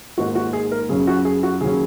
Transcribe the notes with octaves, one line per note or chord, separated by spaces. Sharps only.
G#2 D#3 A#3 D#4 F#4
F#4
G#4
A#4
F#2 C#3 F#3 C#4 G#4
F#4
G#4
F#4
D#2 C#3 F#3 C#4 G#4